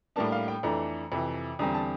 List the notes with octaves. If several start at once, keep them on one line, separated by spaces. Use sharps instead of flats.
A2 G3 A#3 D4 A5
F5
G5
F2 E3 A3 D4 A#5
F2 C3 E3
E2 D3 G3 C4 A#5
A5